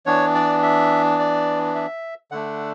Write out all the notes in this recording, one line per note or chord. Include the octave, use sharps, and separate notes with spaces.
E3 B3 D4 C#5
D5
E5
D5
E5
D3 A3 D4 F#5